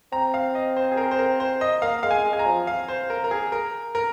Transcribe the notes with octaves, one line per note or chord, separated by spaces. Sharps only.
C4 A#5
F5
D#5
C5
G#4
A#4
C5
A#4
C5
D#5
A#3 F5
G#3 F5
G#5
G#3
G#5
A#5
F3
F5
C5
A#4
A#4
G#4
A#4
A#4